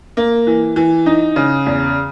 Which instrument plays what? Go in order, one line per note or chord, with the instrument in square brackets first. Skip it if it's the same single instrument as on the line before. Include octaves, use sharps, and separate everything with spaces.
[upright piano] A#3
E3
E3
D#4
C#3
E2